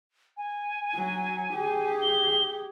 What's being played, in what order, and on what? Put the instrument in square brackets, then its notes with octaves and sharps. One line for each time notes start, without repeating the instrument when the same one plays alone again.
[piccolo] G#5
[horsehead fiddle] F#3
G4 G#4
[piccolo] G7